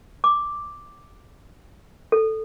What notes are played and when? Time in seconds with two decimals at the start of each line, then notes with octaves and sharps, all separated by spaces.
0.24 D6
2.12 A4